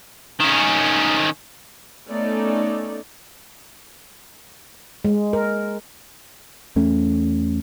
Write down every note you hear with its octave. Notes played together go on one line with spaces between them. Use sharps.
D#3 C#4
A3 B3 C#4 D#4 A4 D5
G#3
A#4
E2 A3 C#4